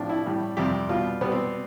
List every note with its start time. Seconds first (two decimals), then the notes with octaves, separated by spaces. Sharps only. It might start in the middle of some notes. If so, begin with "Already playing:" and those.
Already playing: A2 F3 D4
0.09 E4
0.26 A2 G3
0.57 F2 C3 G3 G4
0.89 B2 G3 F4
1.21 B2 G3 B3
1.32 C4